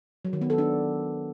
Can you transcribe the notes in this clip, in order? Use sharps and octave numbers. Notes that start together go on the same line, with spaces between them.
F#3
D#3
B3
A4
D4